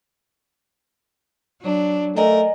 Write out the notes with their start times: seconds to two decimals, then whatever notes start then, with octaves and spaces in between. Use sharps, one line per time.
1.59 F#3 D4
2.17 A3 A#4 D5 D#5 G#5